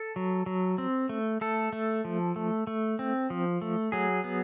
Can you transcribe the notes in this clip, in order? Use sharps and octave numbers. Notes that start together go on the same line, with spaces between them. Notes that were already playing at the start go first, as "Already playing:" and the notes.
Already playing: A4
F#3
F#3
C4
A3
A3 A4
A3
F3
A3
A3
C4
F3
A3
F#3 G#4
B3